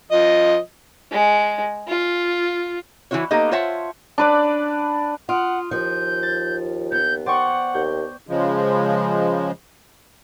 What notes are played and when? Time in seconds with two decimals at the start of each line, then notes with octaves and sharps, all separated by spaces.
0.11 F3 D#5
1.11 G#3
1.87 F4
3.11 E3 F#3 E4 F#4 C#5
3.31 A#3 B3 D#4 G4 A4 D#5
3.51 F4 C5 C#5 E5 F#5 A5
4.18 D4 B4 D5
5.29 F4 F#5 D#6 F6 D7
5.71 D#2 F3 G6
6.23 A6
6.92 B3 G6
7.26 C5 D5 F#5 G5 C#6
7.74 D#2 G6
8.27 C#3 F3 G#3